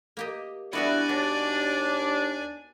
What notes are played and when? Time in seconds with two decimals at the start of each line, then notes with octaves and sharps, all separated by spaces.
0.17 A#3 G4 D#5
0.73 G3 B3 D4 E4 F#4 D5 G#5
1.09 D#2 D4 F#4